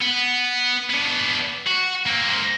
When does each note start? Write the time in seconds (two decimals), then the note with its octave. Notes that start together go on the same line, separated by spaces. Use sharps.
0.02 B3
0.90 B3 D4
1.67 F#4
2.07 A#3 C4